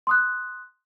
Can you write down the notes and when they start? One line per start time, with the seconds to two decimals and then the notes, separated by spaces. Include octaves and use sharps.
0.07 C6 D#6 F#6